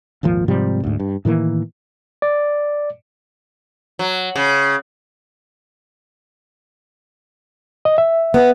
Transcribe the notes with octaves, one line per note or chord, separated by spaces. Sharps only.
D#1 G#1 A#2 F3
G#2 C3 F3 G3
D2 G#2
G2
A2 D#3 E3 A#3
D5
F#3
C#3
D#5
E5
B3